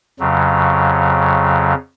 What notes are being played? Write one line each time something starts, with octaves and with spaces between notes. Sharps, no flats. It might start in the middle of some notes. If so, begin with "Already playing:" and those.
F2 C#3 F#3